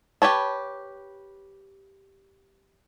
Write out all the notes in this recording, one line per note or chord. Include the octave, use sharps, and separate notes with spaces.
G4 B4 C#5 A5